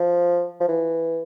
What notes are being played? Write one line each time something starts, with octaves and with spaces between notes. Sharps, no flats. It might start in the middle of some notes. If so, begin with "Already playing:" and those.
Already playing: F3
F3
E3